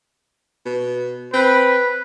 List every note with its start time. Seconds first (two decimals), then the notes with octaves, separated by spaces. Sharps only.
0.65 B2
1.33 C4 B4